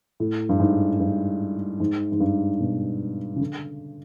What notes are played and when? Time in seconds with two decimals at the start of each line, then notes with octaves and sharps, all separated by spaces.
0.20 A2
0.49 G2
0.60 G#2
1.00 G2
1.80 G#2
2.12 G#2
2.20 G2
2.60 B2
3.36 C#3
3.40 D3